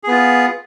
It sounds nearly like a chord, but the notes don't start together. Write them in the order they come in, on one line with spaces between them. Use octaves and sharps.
G#4 B3 F4